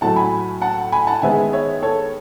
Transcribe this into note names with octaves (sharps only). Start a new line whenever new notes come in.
A2 F#3 A3 F#5 A5
G#5 B5
F#5 A5
G#5 B5
F#5 A5
D#3 G#3 B3 E5 G#5
C#5 E5
A4 C#5